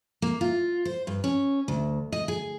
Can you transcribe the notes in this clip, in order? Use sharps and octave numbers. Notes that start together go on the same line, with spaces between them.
A#3
F4
C5
G2
C#4
D2
D#5
G#4